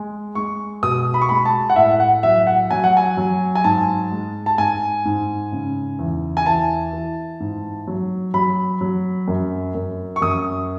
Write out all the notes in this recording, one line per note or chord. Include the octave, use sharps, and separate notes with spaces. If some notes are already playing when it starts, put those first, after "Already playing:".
Already playing: G#3
G#3 C#6
B2 D#6
B5
C#6
G#3 B5
A5
F#5
A2 E5
F#5
F#3 E5
F#5
F#3 G#5
F#5
G#5
F#3
G#5
G#2 A5
G#3
A5
G#2 G#5
G#2
C#3
E2
G#5
E3 A5
E3
G#2
F#3
F#3 B5
F#3
F#2
F#2
C#6
F#2 D#6